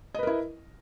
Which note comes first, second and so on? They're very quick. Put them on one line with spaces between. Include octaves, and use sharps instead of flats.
D#5 B4 A#4 E4